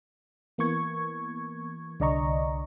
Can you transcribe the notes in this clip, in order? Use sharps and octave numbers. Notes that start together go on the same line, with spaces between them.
E3 A#3 B3 C#6 G#6
C2 D3 D5 D#5 A#5 C#6